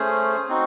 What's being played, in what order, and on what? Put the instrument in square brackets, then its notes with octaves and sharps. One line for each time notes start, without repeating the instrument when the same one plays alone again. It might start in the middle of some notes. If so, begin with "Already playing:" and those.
Already playing: [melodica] A3 C#4 G#4 C5
C4 D#4 F#4